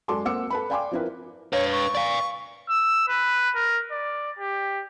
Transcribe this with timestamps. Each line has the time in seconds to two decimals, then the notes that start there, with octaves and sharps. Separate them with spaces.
0.08 F#2 G#3 A4 D5 C6 D6
0.25 A#3 C4 F#5 D6 E6 C#7
0.50 A4 B4 B5
0.70 D5 F5 G5 G#5 C6 D6
0.91 F3 C4 E4 A#4 B4
1.53 B4 C#5 F5
1.72 C#6
1.95 D5 F5
2.69 E6
3.08 B4
3.55 A#4
3.91 D5
4.39 G4